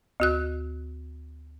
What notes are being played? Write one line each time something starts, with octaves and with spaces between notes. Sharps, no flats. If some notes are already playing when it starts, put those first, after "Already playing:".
D2 F#4 F#6